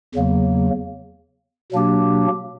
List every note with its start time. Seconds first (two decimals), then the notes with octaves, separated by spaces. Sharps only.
0.15 E2 C#3 F#3 A#3
1.72 B2 F#3 A#3 D4 G4